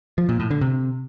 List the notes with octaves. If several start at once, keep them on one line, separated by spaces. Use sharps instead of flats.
F3
A#2
A2
D3
C3